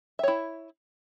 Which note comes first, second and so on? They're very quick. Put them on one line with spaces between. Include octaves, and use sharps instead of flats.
E5 C#5 E4